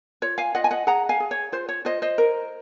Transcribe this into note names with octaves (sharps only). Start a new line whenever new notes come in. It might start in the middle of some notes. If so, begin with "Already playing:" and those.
F4 C#5
F5 G#5
F4 D#5 F#5
G#5
D#5 F#5
G#4 F#5 A#5
F5 G#5
G#4
C#5
F4 C5
C#5
F4 C5 D#5
C5 D#5
A#4